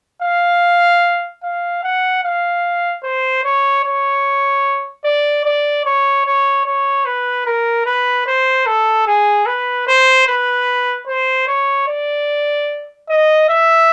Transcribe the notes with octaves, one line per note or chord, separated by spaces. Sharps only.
F5
F5
F#5
F5
C5
C#5
C#5
D5
D5
C#5
C#5
C#5
B4
A#4
B4
C5
A4
G#4
B4
C5
B4
C5
C#5
D5
D#5
E5